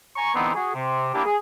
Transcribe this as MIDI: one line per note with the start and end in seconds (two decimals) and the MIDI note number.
0.16 0.34 80
0.16 0.34 82
0.16 0.34 85
0.34 0.52 50
0.34 0.52 52
0.34 0.52 59
0.34 0.52 60
0.34 0.52 63
0.54 0.74 66
0.54 0.74 68
0.74 1.09 48
1.14 1.22 58
1.14 1.22 59
1.14 1.22 62
1.14 1.22 64
1.14 1.22 67
1.25 1.36 68